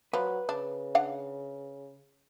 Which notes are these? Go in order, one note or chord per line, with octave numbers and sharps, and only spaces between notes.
F3 F#3 B4
C#3 D4
D4 F5 F#5